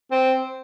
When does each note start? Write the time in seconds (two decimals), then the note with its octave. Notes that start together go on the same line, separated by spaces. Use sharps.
0.11 C4